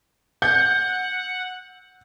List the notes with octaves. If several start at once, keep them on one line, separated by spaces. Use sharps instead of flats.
F#5 G6